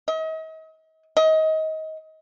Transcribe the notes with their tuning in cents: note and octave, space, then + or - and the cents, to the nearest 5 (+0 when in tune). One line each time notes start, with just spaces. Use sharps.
D#5 +40
D#5 +25